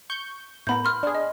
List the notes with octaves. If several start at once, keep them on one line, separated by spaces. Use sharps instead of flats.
C#6 G6
A2 B3 A#4 B5 G6
C6 F6
D4 G#4
D#5